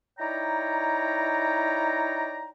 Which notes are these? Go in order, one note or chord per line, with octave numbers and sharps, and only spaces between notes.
D#4 E4 C#5 D5 G5 A#5